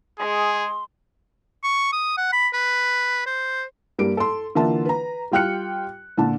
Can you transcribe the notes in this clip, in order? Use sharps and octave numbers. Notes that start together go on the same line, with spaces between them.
G#3 G#4 C6
C#6
D#6
F#5
B5
B4
C5
G2 G3 A#3 D7
A4 C6
D3 E3 A#3 F4 E5 A5
B4 A#5
G3 F4 G5 F6 F#6 C#7
A#2 D3 A5